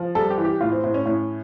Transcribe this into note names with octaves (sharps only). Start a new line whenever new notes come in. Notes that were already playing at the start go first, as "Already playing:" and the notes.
Already playing: F3
G3 A4
G4
E3
G4
A2 F4
C4
A2 C4
C#4
A2 C#4